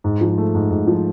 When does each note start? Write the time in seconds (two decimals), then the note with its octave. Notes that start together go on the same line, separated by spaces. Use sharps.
0.04 G#2
0.21 F3
0.38 A3
0.55 G#2
0.71 G#2
0.87 F3